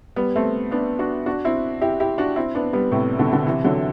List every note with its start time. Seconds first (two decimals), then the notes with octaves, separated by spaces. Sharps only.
0.16 G3 B3
0.36 A3 C4
0.71 B3 D4
0.99 D4 F#4
1.26 D4 F#4
1.45 C4 E4
1.81 E4 G4
2.00 E4 G4
2.18 D4 F#4
2.36 C4 E4
2.55 B3 D4
2.73 G3 B3
2.92 A2 C3
3.19 B2 D3
3.32 B2 D3
3.47 C3 E3
3.64 D3 F#3